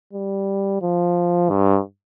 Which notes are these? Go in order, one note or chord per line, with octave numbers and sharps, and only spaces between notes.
G3
F3
G2